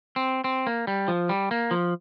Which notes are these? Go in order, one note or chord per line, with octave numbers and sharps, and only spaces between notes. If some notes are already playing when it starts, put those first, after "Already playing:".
C4
C4
A#3
G3
F3
G3
A#3
F3